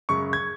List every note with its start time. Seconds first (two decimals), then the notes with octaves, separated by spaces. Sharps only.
0.09 F#2 C#3 G#3 C#6
0.33 G#6